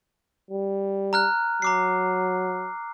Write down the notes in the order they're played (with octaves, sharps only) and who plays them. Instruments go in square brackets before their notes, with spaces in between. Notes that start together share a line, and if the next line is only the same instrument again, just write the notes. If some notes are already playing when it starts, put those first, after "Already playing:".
[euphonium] G3
[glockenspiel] A#5 F6 F#6
[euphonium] F#3 [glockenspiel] A#5 D6 C7